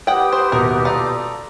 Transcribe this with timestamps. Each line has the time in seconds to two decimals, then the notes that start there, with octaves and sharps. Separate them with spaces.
0.07 G4 B4 F#5 G5 D#6
0.32 C5
0.52 D#1 B2 F#4 A#4
0.85 F4 A4 D5 A#5